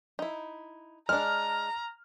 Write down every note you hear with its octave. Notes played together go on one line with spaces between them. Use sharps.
D#4 E4
G#3 D4 A#5 F6